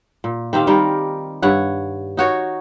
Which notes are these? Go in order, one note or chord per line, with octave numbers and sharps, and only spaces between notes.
A#2
D#3 C4 G4 F5
D#3 G3 A#4
G2 C#5 F#5
D#4 F#4 C#5